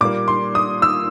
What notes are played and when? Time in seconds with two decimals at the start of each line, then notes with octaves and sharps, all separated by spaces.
0.01 A#2 G3 A#3 D6
0.28 C6
0.55 D#6
0.82 E6